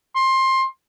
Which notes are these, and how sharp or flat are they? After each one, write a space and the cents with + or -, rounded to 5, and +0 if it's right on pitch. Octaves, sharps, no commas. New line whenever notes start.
C6 +20